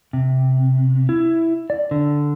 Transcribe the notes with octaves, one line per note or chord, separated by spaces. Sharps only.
C3
E4
D5
D3